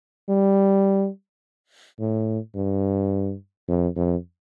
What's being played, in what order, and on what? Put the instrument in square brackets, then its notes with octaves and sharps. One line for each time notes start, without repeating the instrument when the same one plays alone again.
[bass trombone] G3
A2
G2
F2
F2